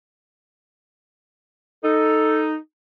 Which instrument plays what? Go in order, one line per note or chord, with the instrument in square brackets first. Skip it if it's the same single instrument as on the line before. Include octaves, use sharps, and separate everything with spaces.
[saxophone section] D#4 [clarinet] A4